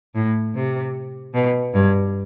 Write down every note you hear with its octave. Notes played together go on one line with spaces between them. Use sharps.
A2
C3
B2
G2